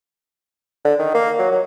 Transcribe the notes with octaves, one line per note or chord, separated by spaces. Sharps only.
D3
D#3
A#3
F#3
F#3